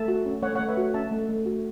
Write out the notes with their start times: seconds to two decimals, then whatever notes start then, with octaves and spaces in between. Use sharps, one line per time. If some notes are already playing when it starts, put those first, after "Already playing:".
Already playing: A3 E5 A5
0.08 F#4
0.26 C#4
0.43 A3 C#5 F#5
0.55 A3 C#5 F#5
0.69 B4 E5
0.77 F#4
0.94 C#4 E5 A5
1.11 A3
1.29 A3
1.46 F#4